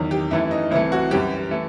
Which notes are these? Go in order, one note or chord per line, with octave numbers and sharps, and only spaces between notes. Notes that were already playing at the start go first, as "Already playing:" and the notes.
Already playing: E2 D#3 F#3
G4
F#2 E3 A3 E4
D#4
C2 C3 E3 A3 E4
F#4
F#2 E3 G3 G4
E3 A3